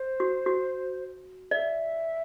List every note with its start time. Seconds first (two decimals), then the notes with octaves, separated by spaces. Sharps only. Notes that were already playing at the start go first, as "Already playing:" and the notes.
Already playing: C5
0.20 F#4
0.46 F#4
1.51 D5 E5